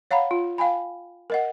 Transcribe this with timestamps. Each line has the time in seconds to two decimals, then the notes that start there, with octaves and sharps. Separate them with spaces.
0.11 C#5 F5 F#5 A#5 B5
0.31 F4
0.58 F5 G5 G#5 B5
1.30 A#4 D#5 F#5